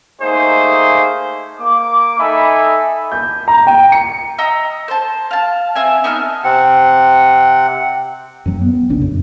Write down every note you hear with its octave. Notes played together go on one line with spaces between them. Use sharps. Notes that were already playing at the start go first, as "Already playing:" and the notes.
A3 A#3 D#4 G#4 C5
A#3 D6
D#4 A4 E5 G#5 B5
G6
A#5
G5
C#7
D#5 A#5 D#6 E6
C5 A5
F5 A5
C4 E5 G#5
B3 D#4 E5 F6
C3 C4 F#5
F#2 F#3
B3
A#1 C#3 D4
F#2